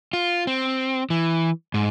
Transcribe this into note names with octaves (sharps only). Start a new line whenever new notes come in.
F4
C4
E3
G#2